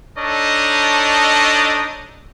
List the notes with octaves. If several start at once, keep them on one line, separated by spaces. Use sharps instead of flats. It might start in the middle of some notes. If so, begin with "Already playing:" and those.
D4 D#4 A4 C#5 D#5